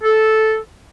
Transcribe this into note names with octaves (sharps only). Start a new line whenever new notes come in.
A4